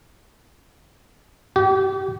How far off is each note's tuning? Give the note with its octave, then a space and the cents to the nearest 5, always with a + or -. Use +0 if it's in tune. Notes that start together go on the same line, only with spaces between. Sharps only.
G4 -35